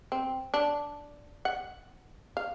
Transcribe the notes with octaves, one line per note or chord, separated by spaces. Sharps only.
C4
D4
F#5
F5